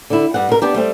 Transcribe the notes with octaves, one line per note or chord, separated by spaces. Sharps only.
D3 E4
G2 F#5
B2 A#4
B3 D4 G4
G3 A3 C4